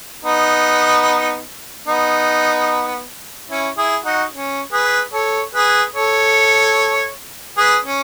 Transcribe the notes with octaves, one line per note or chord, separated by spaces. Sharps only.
B3 D#4
B3 D#4
C#4 E4
E4 G#4
D#4 F#4
C#4
G#4 B4
A4 C#5
G#4 B4
A4 C#5
G#4 B4
C#4